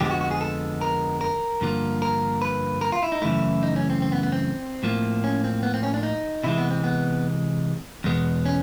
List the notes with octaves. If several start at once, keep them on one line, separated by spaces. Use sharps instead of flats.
F2 D3 F3 G#3 B3 G4
F#4
F#4
G#4
A4
A#4
A#4
G2 D3 F3 A#3
A#4
B4
A#4
F4
E4
D#4
F#2 C#3 E3 A3 E4
D#4
C#4
C4
C4
B3
B3
C4
A2 F3 A#3
C#4
C4
B3
C4
C#4
D4
D#4
C3 E3 G#3 E4
B3
C4
B3
E2 B2 G#3 B3
C#4